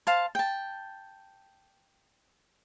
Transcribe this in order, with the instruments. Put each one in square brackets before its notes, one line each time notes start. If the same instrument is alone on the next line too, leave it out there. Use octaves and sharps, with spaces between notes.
[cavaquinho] C5 F5 A5
G5 A5